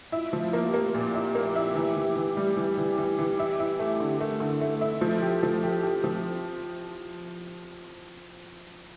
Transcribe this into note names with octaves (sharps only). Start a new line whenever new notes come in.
E4 F4
F3
F4
A#3
G4
A#3
A#2 G4
E4
A#3
E4
E3
E3
E3
G3
E3
E3
E3
E3
E4
E4
A3
D3
A3 A#4
D3
A4
A3
A4
E4
F3 A4
G4
F3
G4
G4
F3